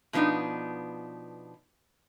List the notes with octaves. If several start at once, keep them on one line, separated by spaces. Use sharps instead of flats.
B2 F3 B3 D4 D#4